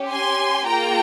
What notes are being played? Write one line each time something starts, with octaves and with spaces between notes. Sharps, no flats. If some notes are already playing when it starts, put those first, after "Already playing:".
Already playing: C#4 G4
G#5 C6
A#3 F4 G#4 G5 A#5